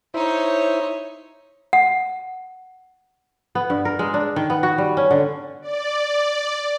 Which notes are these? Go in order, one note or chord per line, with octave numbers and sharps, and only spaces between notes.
D#4 E4 C5 C#5 E5
F#5
B3
G2
A#4
G#3
D4
D#3
B3
F#4
G3
C#4
D3
D5